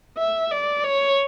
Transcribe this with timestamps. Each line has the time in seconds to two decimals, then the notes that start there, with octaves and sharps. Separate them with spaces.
0.18 E5
0.51 D5
0.84 C#5